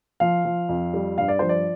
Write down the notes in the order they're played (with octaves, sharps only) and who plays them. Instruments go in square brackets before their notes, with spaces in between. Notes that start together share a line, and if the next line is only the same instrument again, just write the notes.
[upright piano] F3 F5
F3
F2
G3
G2 F5
D5
F3 C5
D5